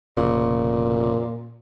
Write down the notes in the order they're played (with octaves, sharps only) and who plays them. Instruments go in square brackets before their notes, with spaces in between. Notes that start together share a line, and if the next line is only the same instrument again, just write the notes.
[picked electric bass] F1 C#3 [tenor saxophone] A#2